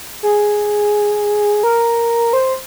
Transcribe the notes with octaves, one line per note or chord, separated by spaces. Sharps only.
G#4
A#4
C5